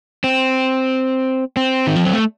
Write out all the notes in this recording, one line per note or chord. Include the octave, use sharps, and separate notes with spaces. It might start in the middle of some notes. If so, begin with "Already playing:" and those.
C4
C4
D#3
F3
F#3
A3